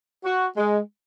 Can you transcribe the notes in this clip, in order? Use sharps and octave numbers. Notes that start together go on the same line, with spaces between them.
F#4
G#3